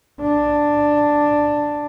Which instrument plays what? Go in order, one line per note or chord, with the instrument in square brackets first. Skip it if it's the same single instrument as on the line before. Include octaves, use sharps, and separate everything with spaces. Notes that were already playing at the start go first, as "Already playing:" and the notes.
[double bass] D4